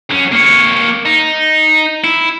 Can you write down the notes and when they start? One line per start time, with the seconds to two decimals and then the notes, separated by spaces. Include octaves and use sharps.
0.11 F#3 C#4
0.32 A#3 C#5
1.05 D#4
2.04 E4